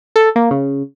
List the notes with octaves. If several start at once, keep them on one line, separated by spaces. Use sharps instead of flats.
A4
A#3
C#3